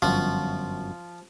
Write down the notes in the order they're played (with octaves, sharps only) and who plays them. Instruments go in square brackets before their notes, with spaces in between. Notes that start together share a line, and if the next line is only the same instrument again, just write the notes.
[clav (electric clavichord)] G1 F#2 F#4 [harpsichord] F3